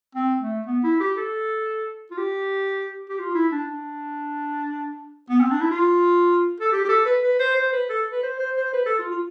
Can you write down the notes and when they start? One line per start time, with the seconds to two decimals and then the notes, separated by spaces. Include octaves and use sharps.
0.15 C4
0.41 A3
0.67 B3
0.84 E4
1.00 G4
1.17 A4
2.11 F4
2.18 G4
3.09 G4
3.19 F4
3.35 E4
3.52 D4
3.69 D4
5.30 B3
5.41 C4
5.51 D4
5.61 E4
5.71 F4
6.61 A4
6.72 G4
6.85 G4
6.89 A4
7.06 B4
7.23 B4
7.40 C5
7.56 C5
7.73 B4
7.89 A4
8.12 B4
8.23 C5
8.40 C5
8.57 C5
8.73 B4
8.86 A4
8.99 F4
9.11 F4